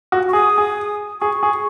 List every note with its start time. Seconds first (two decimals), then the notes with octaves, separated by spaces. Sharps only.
0.12 F#4
0.29 C#6
0.33 G#4 D#6
0.58 G#4
1.21 G#4 C#6
1.43 G#4